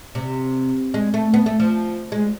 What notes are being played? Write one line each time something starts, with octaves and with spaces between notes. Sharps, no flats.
C3
G#3
A3
B3
A3
F3
G#3